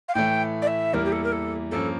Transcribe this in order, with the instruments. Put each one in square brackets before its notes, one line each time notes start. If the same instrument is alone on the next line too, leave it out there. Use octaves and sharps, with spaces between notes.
[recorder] F5
[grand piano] A2 E3 A3 [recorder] G5
[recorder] D5
E5
[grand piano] E2 E3 G3 A#3 E4 [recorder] A#4
[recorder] G4
A4
A#4
A4
[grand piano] G2 F3 A#3 C#4 [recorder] A4